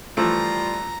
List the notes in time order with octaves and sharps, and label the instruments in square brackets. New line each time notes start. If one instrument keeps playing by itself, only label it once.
[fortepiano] E3 F3 A3 [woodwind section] G3 F4 [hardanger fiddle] A#5